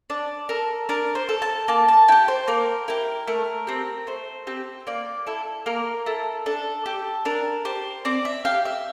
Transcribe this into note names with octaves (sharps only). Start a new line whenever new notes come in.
D4 D5
A4 A#4
D4 A#4
C5
A4
A5
A#3 A5
A5
E4 G4 G5
C5
A#3 A#4
E4 G4 A#4
A3 A#4
C4 G4
A3 C5
C4 G4
A#3 D5
E4 A4
A#3 A#4
E4 A4
D4 A4
G4
D4 A#4
G4 C5
C4 D5
E5
G4 F5
E5